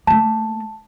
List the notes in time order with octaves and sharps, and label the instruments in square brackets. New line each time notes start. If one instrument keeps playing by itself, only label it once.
[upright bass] A3 A#3 [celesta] A5